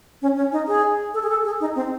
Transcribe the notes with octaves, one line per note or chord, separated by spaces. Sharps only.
C#4
C#4
D#4
G#4
A4
G#4
A4
G#4
D#4
C4